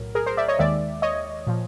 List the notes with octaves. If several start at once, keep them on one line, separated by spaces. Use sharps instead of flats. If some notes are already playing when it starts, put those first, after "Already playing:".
Already playing: B1 A2 F#3 A#4
G#4 A#4
A#4 C5
D5 E5
C#5 D#5
D#2 D#3 G#3 D5 E5
C#5 D#5
A#2 F3